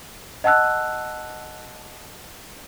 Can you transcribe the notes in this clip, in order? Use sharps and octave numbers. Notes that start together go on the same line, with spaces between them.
D#5 F#5 A5 E6 F#6